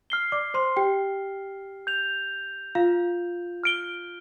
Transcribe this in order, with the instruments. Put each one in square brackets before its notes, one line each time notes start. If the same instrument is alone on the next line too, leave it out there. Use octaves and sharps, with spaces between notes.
[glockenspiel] F6 C7 G7
[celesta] D5 D6
C5 C6
G4 G5
[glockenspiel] G6 F7
[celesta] F4 F5
[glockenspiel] F6 D7 G7